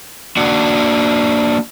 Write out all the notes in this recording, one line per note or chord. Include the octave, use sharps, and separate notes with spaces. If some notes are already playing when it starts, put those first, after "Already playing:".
A#3 D4 F#4 F#5